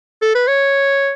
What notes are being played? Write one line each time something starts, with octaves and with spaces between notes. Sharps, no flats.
A4
B4
C#5